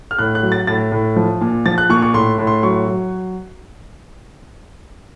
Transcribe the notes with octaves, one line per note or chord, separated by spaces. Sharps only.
F6
A2 F#6
F#6
F#3
A6
A2 A6
A2
F3
A#2
F3 A6
F#6
A#2 C#6
C#6
A2 C6
A2
C6
F#3 C#6
F#3